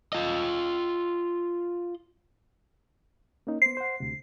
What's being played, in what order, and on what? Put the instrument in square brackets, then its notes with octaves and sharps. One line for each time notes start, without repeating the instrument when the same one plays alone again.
[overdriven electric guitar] F4 D#5
[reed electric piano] A#3 C#4 D#4
[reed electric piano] B3 C5 [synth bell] C7
[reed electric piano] C5 F#5
D2 C3